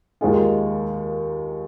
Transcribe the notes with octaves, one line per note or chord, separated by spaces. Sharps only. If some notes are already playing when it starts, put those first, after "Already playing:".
D#2 D#3 G#3 F4 G#4